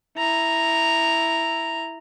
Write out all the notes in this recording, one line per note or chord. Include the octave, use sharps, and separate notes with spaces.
E4 A#5